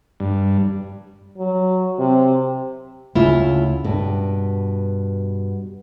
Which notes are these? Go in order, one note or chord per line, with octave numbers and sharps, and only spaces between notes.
G2
F#3
C3
D2 C#3 A3 E4 F4
G2 B2